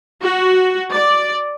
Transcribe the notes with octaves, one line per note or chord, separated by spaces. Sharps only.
F#4
D5